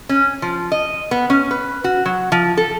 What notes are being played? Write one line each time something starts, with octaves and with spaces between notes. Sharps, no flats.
C#4
F3
D#5
B3
C#4
B4
F#4
F#3
F3
A4